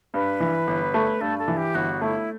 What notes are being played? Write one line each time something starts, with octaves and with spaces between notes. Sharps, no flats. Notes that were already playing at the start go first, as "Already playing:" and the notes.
G2 B4
E3
G1
A3
G2 A4
A4
E3
G4
G1 F#4
A3 E4